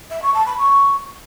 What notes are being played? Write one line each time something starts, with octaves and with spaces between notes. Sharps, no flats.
E5
C#6
A5
B5
C#6